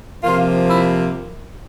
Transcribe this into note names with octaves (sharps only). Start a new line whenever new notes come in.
C3 F3 A#3 F4
E4